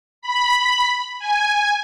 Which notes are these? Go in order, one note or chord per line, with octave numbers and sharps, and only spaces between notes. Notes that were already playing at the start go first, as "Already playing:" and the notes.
B5
G#5